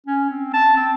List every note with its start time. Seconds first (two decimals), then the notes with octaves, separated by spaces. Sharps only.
0.07 C#4
0.30 C4
0.54 A5
0.77 C4